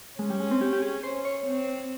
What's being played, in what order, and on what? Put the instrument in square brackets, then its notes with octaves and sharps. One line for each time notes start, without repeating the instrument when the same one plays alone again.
[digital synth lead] G#3 [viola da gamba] C#4
[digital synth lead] G3
G#3
C4
G4
G4
G#4
[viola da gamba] C#4 [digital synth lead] C5
[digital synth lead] C#5
[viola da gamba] C4